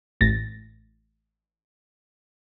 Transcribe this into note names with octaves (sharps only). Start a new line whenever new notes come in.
A1 A6 A#6